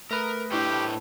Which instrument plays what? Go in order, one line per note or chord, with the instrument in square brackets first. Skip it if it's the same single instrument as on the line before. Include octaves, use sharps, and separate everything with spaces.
[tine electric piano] A3 B4 [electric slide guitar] A#4 [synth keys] D#6 A#6 B6
[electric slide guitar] A2 A4 C5 [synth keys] D4 E4 C#6 [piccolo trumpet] G4